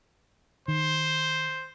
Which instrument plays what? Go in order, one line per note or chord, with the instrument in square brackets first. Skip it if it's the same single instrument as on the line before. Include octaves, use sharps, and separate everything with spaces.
[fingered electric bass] D#3 [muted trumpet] C5